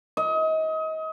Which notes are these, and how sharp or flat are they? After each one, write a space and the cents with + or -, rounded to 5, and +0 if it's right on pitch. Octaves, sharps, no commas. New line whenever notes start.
D#5 +30